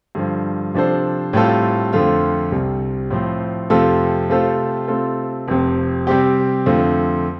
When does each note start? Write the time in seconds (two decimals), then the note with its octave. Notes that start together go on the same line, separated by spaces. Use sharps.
0.15 G2 D3 F3
0.74 C3 F3 D4 A4 C5
1.33 A2 G3 C4 F4 A4
1.93 F2 D3 F3 A3 F4
2.52 C2 C3 G3
3.11 A2 F3 C4
3.70 F2 C3 A3 F4 A4
4.30 C3 A3 F4 A4 C5
4.88 C3 A3 C4 F4 A4
5.48 F1 F2 C3
6.07 C3 G3 C4 G4
6.66 F2 D3 A3 C4 F4